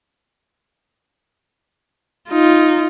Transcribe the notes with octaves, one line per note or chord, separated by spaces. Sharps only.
D#4 F4